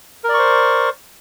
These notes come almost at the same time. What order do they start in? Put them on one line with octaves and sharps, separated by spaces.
A#4 D5 C#6 C5